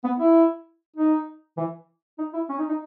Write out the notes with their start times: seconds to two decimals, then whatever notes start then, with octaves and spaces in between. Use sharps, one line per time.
0.04 B3
0.19 E4
0.96 D#4
1.57 E3
2.19 D#4
2.34 E4
2.49 C#4
2.59 D#4
2.69 D#4